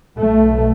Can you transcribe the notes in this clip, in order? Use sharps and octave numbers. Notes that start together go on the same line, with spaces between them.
B1 B2 A3